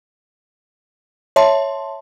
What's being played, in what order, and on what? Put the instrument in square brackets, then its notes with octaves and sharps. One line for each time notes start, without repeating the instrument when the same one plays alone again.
[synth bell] C#5 E5 A5 C6